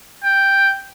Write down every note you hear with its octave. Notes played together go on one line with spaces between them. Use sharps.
G5